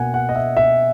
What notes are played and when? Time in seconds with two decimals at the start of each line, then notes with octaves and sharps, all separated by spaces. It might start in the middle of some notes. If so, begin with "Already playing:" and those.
Already playing: B2 A#3 F#5 G#5
0.14 F#5
0.29 D#5
0.35 E5
0.57 E5